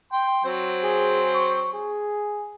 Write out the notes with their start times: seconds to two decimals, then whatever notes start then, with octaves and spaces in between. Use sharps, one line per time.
0.12 G5 C6
0.45 F#3 C4 C5
0.83 G#4
1.34 C#6
1.73 G#4